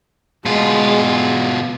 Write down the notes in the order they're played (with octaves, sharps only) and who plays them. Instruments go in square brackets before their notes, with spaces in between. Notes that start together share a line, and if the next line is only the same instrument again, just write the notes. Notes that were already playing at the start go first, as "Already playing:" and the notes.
[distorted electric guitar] B2 F4 [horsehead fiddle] G#3